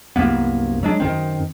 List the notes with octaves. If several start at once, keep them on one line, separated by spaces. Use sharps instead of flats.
C2 F#2 A#3 B3
F#3 G#3 D4
F#2 D#3 C4